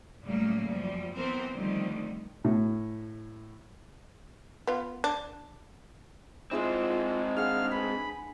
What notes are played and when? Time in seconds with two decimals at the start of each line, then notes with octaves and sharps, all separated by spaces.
0.23 A2 C#3 F#3 G3 A3 A#3
0.66 F#2 F3 G3
1.14 E3 B3 C4 A#4 C5
1.53 D3 D#3 F3 G3 A3 C4
2.44 A2
4.67 B3 F4
5.04 D4
6.51 G#3 C4 E4 F4 G#4 C5
7.37 D4 G#4 F5 F#5 F6
7.71 B4 B5